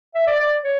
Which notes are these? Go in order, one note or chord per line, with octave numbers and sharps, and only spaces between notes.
E5
D5
D5
C#5